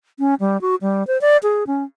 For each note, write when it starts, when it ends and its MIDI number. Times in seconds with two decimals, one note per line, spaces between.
0.19 0.35 61
0.40 0.60 55
0.61 0.75 66
0.82 1.06 55
1.07 1.20 72
1.21 1.37 74
1.43 1.64 68
1.67 1.84 61